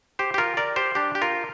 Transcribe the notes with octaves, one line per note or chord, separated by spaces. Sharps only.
G4 C5
G4
F4 A#4
A#4 D5
G4 C5
D4 G4
G4
F4 A#4